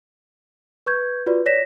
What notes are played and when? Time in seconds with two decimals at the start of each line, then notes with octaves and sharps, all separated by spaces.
0.86 B4 C#6 G6 G#6
1.26 F4 F#4 B4 D5
1.46 C#5 D5 A#6 B6 E7